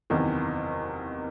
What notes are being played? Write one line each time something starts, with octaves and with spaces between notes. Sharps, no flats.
F#1 E2 C3 D#3